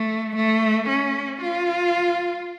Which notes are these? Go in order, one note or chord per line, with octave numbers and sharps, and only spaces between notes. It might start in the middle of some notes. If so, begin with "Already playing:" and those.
Already playing: A3
A3
C#4
F4